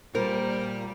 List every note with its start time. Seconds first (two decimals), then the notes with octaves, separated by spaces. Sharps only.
0.15 A#2 G3 A#4 C5